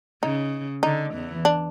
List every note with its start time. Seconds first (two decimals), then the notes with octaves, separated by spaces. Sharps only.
0.23 C#3 D#4
0.83 D3 D#4
1.14 E2 E3
1.45 D4